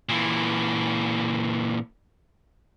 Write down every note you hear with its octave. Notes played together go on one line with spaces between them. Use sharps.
A#2 E3